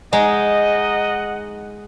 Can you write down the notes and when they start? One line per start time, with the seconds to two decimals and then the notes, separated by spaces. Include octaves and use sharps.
0.13 G#3 D#4 D#5 F#5